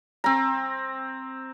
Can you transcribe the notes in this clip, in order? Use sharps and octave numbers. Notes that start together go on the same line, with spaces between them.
C4 A#5